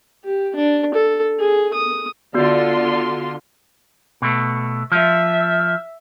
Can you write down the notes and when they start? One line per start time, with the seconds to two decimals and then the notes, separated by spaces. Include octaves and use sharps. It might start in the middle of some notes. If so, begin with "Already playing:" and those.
0.25 G4
0.56 D4
0.94 A4
1.39 G#4
1.74 D#6
2.34 D3 B3 F4 F#4 D5 C6
4.22 B2 A3
4.92 F3 E5